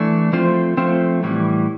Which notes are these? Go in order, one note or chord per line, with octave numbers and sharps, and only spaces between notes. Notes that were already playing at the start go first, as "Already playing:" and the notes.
Already playing: E3 A3 D4
F3 A3 C4 F4 C5
F3 A3 C4 F4 C5
A2 E3 G3